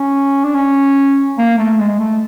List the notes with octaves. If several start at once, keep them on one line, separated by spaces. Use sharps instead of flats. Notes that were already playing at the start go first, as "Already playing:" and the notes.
Already playing: C#4
D4
C#4
A#3
A3
G#3
A3